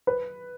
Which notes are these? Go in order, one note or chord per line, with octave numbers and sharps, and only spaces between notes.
B4